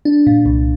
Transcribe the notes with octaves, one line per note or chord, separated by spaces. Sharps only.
D4
A#2
C2